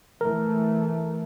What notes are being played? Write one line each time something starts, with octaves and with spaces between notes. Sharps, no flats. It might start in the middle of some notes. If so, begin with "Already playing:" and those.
E3 A3 A#4